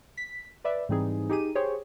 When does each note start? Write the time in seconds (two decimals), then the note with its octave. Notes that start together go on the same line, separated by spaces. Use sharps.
0.17 B6
0.64 B4 D5 E5
0.89 G#2 E3 G3 C4 D#4 G#4
1.29 D#4 G4 G#4 D#7
1.55 G4 G#4 C5 C#5 G5